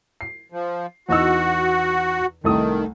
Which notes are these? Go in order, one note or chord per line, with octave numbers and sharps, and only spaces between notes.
C7
F3
E2 D#4 F#4 E6
C2 D#3 A3 D#6